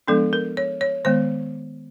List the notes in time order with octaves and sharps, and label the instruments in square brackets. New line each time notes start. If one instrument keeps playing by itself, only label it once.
[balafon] F3 G#3 B3 D4 A4
A#4
C#5
C#5
D#3 G#3 B3 C5